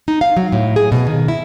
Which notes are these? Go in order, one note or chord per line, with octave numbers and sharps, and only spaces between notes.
D#4
F5
F#3
A2
G#4
B2
D#3
E4